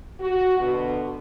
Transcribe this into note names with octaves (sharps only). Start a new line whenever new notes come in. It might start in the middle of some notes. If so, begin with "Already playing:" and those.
F#4
B2 D3